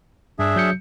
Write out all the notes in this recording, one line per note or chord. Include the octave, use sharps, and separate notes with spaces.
G2 D4 G#4 E5
F#3 G6 C#7